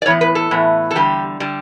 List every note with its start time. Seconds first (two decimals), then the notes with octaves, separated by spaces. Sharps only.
0.02 D5
0.06 A2 E3 B3 C#5
0.21 B4
0.35 A4
0.51 A2 E3 B3
0.91 A4
0.95 E2 D3 G3 G4
1.40 D3 G3